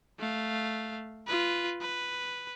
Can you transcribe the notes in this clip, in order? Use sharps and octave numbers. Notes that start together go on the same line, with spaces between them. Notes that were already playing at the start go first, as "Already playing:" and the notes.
A3 F5
F4 B4
B4